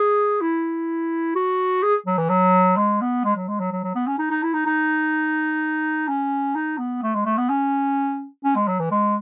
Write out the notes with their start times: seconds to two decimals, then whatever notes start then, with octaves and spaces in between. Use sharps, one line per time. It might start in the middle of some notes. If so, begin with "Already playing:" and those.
Already playing: G#4
0.41 E4
1.36 F#4
1.83 G#4
2.06 F#3
2.18 E3
2.29 F#3
2.77 G#3
3.01 B3
3.24 G#3
3.36 F#3
3.48 G#3
3.60 F#3
3.72 F#3
3.84 F#3
3.95 B3
4.07 C#4
4.18 D#4
4.31 D#4
4.43 E4
4.54 D#4
4.66 D#4
6.08 C#4
6.55 D#4
6.78 B3
7.02 A3
7.15 G#3
7.25 A3
7.38 B3
7.49 C#4
8.44 C#4
8.56 G#3
8.68 F#3
8.80 E3
8.91 G#3